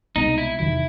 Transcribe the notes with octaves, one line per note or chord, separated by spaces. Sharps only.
C2 B2 G#3 C4 D#4
E4
E2 C3 D#3 F#3 E4